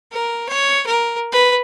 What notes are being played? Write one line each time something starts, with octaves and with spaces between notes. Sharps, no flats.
A#4
C#5
A#4
B4